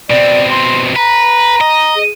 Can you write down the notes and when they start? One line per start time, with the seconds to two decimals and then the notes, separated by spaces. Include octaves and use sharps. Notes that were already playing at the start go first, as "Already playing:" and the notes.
0.10 B2 C4 D5
0.51 C6
0.96 B4 A#5
1.61 D#5
1.96 G#4